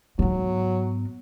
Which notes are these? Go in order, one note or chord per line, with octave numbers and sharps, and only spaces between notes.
G#2 F#3 B3